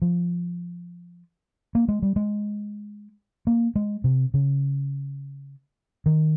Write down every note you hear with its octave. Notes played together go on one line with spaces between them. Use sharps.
F3
A#3
G#3
G3
G#3
A#3
G#3
C3
C#3
D#3